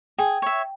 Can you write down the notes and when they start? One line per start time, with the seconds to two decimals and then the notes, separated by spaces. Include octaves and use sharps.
0.18 G#4 G5
0.42 C#5 E5